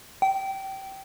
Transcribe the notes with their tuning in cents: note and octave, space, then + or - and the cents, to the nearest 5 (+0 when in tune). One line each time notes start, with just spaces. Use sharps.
G5 -25